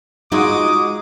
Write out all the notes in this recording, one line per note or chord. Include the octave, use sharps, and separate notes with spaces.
G#3 D#4 F4 F#4 D6 D#6